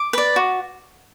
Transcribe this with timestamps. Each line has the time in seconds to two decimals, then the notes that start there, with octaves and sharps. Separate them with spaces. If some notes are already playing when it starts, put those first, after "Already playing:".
Already playing: D6
0.13 B4 D5
0.36 F#4